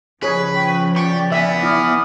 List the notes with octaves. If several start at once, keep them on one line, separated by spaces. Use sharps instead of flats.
C#3 F3 G#4 B4 C#5
G5 C#6
G4 D5 C#6
E3 B3 E5
E4 D6 D#6 F6